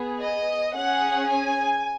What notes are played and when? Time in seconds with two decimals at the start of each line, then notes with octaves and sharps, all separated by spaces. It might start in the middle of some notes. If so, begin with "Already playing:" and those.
Already playing: B3 G#4
0.20 D#5
0.74 C#4 G#4 F#5
1.28 G#5